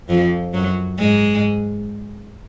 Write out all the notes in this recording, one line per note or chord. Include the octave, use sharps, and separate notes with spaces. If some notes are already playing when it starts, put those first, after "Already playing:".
F2 F3
F#2 F#3
G#2 G#3